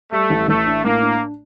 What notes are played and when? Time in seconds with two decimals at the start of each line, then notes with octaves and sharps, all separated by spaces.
0.12 G3 A3
0.30 A1
0.48 A1 A3
0.66 D4
0.84 A2 A#3
1.02 D4